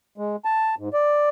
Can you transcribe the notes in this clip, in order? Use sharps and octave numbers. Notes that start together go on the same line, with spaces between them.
G#3
A5
G#2
D5